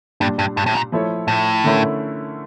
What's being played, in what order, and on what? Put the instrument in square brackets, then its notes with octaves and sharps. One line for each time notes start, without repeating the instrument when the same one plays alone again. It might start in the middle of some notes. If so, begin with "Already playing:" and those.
[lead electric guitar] G2 [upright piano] A#2 G3 D4
[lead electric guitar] G2
G2
A2
A#2
[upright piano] F3 A3 E4 A4 C#5
[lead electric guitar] A2
[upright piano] D3 A3 C#4 E4 A#4